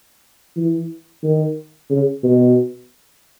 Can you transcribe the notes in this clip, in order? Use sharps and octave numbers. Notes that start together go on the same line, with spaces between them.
E3
D#3
C#3
B2